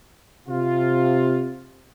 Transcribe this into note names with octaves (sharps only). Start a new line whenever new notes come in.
C3 F4